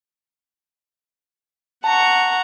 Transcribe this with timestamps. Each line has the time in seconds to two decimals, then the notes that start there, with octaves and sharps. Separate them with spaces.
1.84 F#5 A5 A#5 C#6